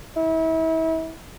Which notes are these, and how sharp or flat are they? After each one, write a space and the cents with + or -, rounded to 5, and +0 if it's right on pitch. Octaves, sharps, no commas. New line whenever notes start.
E4 -35